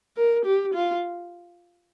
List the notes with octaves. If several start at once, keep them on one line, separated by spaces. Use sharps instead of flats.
A#4
G4
F4